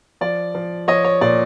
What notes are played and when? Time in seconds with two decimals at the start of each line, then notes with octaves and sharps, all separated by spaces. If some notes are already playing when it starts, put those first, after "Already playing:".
0.21 F3 D5
0.55 F3
0.88 F3 C#5 D#5
1.04 C#5
1.21 A#2 D5